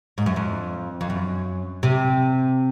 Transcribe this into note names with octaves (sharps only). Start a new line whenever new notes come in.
G#2
F#2
F2
F2
F#2
C3